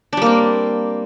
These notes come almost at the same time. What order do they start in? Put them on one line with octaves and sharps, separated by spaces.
D4 G3 A#3 C4